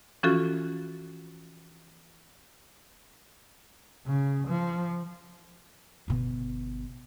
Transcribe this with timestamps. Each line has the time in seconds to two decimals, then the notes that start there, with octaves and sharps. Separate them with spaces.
0.23 E3 F3 C#4 F4 F#4 A4
4.06 C#3
4.47 F3
6.08 G1 B2